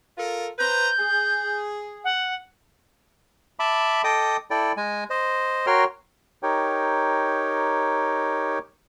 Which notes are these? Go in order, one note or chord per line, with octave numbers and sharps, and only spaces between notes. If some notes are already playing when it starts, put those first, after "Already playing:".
F4 A4 A#4
B4 C5 A#5 G6
G#4
F#5
E5 A5 B5 D6
A4 D#5 G5 D6 D#6
E4 A4 D5 G5
G#3 G#5
C5 D#5
F#4 A#4 C#5 G5 C6 F6
D#4 G4 A#4 C#5 G5